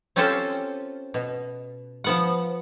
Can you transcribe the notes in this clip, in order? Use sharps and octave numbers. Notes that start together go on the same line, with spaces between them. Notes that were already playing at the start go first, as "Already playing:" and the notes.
C4 C#4 F4 G4 A4 C5
B2
F3 B3 F#5